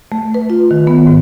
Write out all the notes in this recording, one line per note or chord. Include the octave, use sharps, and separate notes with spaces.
A3
B4
F4
D#3
B3
G#2